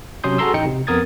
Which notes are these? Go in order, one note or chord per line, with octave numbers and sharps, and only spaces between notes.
C3 F#3 C#4 C6 D#6 G6
F#4 G#4 A4 A#5 C6 E6
A1 D#4 G5 C#7
C3
F2 B3 A#4 D#6 G#6 A6